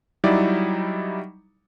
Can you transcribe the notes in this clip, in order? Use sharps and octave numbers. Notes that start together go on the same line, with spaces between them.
F#3 G3 D#4 E4 D5